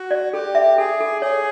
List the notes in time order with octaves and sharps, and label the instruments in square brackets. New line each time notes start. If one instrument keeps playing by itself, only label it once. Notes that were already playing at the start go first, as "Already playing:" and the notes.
Already playing: [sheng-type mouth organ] F#4
[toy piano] D5
[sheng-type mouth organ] G4 [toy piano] A4
[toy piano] E5
[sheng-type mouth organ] G#4 [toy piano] A4
[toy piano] A4
[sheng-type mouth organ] G#4 [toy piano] C#5